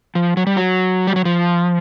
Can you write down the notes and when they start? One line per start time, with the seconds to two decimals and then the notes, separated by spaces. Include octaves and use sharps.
0.15 F3
0.37 F#3
0.47 G3
0.56 F#3
1.07 G3
1.16 F#3
1.25 F3